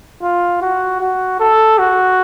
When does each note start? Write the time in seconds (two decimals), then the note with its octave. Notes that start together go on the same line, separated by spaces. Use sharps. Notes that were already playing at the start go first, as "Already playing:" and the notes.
0.22 F4
0.61 F#4
1.01 F#4
1.40 A4
1.78 F#4